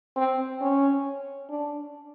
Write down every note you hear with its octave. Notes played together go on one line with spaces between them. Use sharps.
C4
C#4
D4